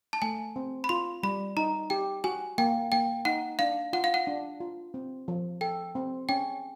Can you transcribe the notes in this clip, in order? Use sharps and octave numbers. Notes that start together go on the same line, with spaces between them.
A5
A3 G#5
C4
B5
F4 C6
G3 B5
D#4 A#5
G4 G5
F#4 G#5
A#3 G5
A#3 G5
D#4 F#5
D4 F5
F4 F#5
F5
F#5
D4
F4
C4
F3
A4 G5
C4
C#4 G5